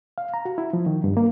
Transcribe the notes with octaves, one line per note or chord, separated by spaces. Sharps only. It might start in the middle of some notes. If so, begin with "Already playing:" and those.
F5
A#5
F#4
E4
F3
D#3
G2
A#3